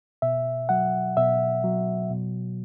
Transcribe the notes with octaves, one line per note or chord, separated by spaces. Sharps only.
B2 E5
F#3 F#5
B2 E5
F#3
B2